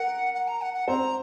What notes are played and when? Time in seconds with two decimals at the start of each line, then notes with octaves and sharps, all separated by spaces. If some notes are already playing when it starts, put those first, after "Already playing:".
Already playing: A#4 F#5
0.34 F#5
0.48 A#5
0.62 F#5
0.74 F#5
0.88 C4 C5 A#5